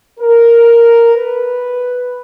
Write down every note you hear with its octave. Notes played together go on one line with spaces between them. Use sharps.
A#4
B4